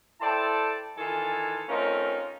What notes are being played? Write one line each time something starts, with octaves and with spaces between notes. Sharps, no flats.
E4 A4 C5 D5 G5 A5
D#3 E3 F4 A4 G#5
A3 C4 C#4 D#4 F4 A#4